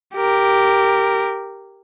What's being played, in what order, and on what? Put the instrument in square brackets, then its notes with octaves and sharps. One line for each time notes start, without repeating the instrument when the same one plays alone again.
[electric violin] G4 A#4